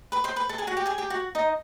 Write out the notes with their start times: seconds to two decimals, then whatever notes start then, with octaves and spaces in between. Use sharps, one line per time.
0.12 B4 B5
0.24 C5 C6
0.36 B4 B5
0.49 A4 A5
0.58 G#4 G#5
0.67 F#4 F#5
0.77 G4 G5
0.86 G#4 G#5
0.98 G4 G5
1.10 F#4 F#5
1.35 D#4 D#5